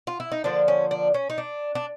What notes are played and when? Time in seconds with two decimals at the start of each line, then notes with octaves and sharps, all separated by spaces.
0.07 F4
0.20 E4
0.32 D#4
0.44 D3 F3 A#3 D4
0.68 C#4
0.91 D4
1.14 C#4
1.30 D#4
1.38 D4
1.75 D4